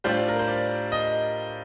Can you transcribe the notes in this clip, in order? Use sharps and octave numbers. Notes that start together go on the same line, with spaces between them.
A2 G3 D4 F4 C5
A#4
C5
D5
D#5